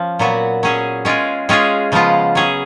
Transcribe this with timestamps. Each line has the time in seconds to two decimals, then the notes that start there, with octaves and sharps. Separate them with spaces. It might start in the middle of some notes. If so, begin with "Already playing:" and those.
Already playing: F3 C#4
0.19 A#2 F#3 B3 F#4
0.63 F#3 C#4 G#4
1.05 G#3 C#4 F4 G#4
1.49 G#3 C#4 F4 G#4
1.92 C#3 F3 G#3 B3 F4
2.35 F#3 C#4 G#4